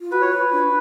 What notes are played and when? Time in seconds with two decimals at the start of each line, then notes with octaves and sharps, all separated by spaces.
0.01 F4
0.12 F#4 B4
0.22 C#5
0.32 F4 B4
0.53 D4